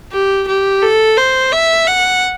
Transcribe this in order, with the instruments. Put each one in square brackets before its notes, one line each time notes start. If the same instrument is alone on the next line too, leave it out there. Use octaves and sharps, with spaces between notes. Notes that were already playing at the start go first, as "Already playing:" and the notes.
[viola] G4
G4
A4
C5
E5
F#5